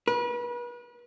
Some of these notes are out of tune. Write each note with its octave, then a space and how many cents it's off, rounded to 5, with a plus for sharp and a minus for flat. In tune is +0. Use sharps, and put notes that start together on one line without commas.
B4 -35